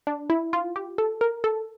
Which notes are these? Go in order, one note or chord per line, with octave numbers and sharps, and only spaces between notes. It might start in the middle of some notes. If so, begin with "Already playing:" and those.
D4
E4
F4
G4
A4
A#4
A4